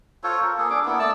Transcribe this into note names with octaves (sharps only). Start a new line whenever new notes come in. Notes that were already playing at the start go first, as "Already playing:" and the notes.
F4 A4 C5 C#5
A#4
A#3 G#4 A4
D4 G#4 D6
A#3 B3 E4
A3 D5 A5 E6